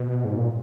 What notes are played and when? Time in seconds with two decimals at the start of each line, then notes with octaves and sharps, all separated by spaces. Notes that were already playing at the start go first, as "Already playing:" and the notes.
Already playing: B2
0.25 G#2
0.37 A#2